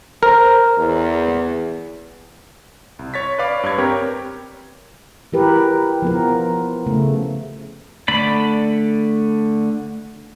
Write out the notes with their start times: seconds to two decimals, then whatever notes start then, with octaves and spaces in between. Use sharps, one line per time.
0.23 A#4 C5
0.78 E2
2.99 C2
3.14 C#5 A6 B6
3.38 B4 C#5 D5 F5 D6
3.63 G2 G#6
3.78 C4 G4 A#4 B4 C#5
5.33 E3 F#4 G4 A#4 B4
6.02 F3 B3 A#4
6.86 C#3 A3
8.08 D3 A3 D5 B5